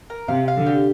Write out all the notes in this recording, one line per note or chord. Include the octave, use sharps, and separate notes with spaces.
A#4
C3 F5
F5
D3
G4